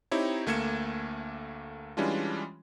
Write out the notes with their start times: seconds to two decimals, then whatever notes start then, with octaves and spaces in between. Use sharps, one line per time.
0.11 C4 D#4 E4 G4 C#5
0.46 D2 A3 A#3 G#6 C#7 E7
1.97 E3 G3 G#3 C#4 D4 F4